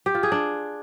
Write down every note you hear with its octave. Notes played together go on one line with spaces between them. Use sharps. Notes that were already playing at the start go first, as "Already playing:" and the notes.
G4
F4
G#4
D4